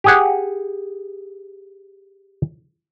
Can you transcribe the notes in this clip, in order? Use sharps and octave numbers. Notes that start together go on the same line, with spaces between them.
G4 G#4 F#5